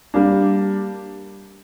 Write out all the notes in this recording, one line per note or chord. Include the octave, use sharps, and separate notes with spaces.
G3 A#3 D4